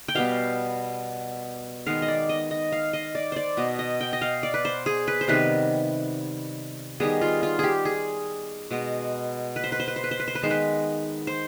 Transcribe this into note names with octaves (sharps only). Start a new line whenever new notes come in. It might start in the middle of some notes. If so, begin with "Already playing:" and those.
G5
B2 G3 B3 F5
D#3 G#3 B3 F5
D#5
D5
D#5
D#5
F5
D#5
D5
C5 D5
B2 B3 D#5
D#5
G5
D#5
F5
D5
B4
C5
G#4
B4
C5
C3 D#3 G3 B3 B4
D#3 G3 B3 G#4
F4
F4
G4 G#4
G#4
B2 G#3 B3
B4
C5
B4
C5
B4
C5
B4
C5
B4
C5
B4
D#3 G#3 B3 C5
B4
C5